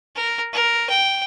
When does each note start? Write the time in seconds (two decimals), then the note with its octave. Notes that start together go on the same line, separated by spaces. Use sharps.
0.16 A#4
0.53 A#4
0.90 G5